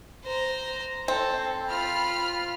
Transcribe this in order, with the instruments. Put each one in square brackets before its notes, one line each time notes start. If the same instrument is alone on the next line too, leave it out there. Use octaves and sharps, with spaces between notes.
[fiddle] C5 A#5
[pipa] C4 [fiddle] A4
[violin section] F4 F6 [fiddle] B5